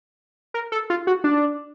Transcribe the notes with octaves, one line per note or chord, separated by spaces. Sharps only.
A#4
A4
F4
F#4
D4